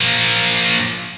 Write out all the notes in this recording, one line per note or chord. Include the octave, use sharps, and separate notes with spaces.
F3 A#3